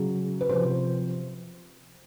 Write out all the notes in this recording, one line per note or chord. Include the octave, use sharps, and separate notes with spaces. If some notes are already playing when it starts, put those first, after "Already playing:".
Already playing: C#3 F#3
B4
C3 F3 C5